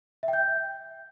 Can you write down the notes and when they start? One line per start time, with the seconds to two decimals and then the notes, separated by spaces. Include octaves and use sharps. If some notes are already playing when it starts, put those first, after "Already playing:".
0.23 E5
0.28 G5
0.33 G6